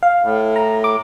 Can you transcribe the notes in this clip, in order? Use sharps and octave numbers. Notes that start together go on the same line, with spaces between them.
F5
A2
A#5
D6